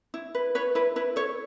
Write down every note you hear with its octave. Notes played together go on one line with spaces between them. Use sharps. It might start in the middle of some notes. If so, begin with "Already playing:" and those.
E4
B4
B4 C#5
E4 B4
E4 B4
A4 C#5